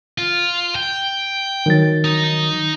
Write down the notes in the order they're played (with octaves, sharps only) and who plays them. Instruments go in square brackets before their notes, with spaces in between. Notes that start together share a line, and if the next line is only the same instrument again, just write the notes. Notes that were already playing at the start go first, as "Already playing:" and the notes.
[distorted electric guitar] F4
G5
[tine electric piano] D#3 F#3 A6
[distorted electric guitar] D#4